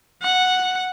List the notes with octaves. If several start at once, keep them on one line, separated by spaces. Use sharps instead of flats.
F#5